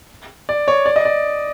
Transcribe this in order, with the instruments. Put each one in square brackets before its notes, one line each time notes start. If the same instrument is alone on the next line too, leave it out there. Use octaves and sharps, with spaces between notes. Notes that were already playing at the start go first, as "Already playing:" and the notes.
[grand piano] D5
C#5
D5
D#5
D5